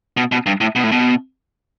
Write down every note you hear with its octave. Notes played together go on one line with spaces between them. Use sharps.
B2
B2
G2
A2
B2
A2
B2